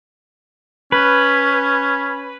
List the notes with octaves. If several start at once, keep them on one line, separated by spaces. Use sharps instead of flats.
C#4 B4